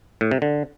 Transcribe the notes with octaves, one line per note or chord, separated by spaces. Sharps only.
A2
C3
D3